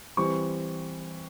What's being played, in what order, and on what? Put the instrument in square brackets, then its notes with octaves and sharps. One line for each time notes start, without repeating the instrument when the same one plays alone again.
[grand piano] E3 G3 C4 C#6